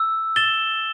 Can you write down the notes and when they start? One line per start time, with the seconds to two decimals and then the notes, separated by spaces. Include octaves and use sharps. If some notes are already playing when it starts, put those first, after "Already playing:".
Already playing: E6
0.36 A6 E7 G7